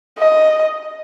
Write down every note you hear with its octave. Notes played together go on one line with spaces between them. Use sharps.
D#5